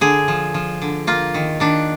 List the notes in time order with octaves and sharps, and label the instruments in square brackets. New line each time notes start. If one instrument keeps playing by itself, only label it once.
[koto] D3 G#4
F3
F3
D3
A#3 F4
D#3
D#3 D4